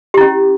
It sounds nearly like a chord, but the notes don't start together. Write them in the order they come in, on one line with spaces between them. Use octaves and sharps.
G4 E4 C#4